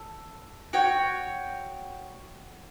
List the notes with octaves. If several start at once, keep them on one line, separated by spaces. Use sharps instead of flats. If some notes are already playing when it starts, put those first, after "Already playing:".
Already playing: A4
F#4 C#5 G5